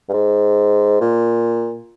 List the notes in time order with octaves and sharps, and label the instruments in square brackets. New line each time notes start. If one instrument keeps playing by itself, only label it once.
[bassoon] G2
G#2
A#2